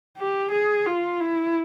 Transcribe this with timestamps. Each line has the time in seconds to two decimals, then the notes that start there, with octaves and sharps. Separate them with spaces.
0.18 G4
0.51 G#4
0.86 F4
1.20 E4